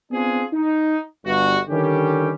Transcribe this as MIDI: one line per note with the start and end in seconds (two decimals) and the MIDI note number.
0.11 0.44 59
0.11 0.44 60
0.11 0.44 62
0.11 0.44 65
0.11 0.44 68
0.53 0.99 63
1.25 1.58 31
1.25 1.58 43
1.25 1.58 66
1.69 2.33 50
1.69 2.33 51
1.69 2.33 55
1.69 2.33 61
1.69 2.33 67